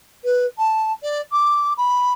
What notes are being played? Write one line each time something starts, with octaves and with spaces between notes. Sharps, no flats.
B4
A5
D5
D6
B5